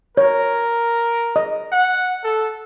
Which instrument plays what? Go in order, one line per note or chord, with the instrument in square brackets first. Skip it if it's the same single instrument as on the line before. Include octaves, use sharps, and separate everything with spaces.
[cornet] A#4 [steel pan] C#5
[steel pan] D#5
[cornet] F#5
A4